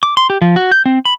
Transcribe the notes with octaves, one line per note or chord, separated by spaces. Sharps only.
D6
C6
G4
F3
F#4
G6
C4
B5